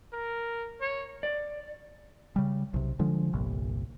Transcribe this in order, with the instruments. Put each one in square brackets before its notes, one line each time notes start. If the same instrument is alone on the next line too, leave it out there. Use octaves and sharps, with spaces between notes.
[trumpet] A#4
C#5
[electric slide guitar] D5
[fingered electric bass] C#3 G3
B1 C3
D3 F3 G#3
G1 C2 A#2